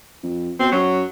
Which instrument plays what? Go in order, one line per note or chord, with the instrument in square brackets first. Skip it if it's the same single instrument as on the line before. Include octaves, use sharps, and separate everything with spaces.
[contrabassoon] F2
[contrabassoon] B2 [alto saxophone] C4
[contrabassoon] F#2 [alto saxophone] F#3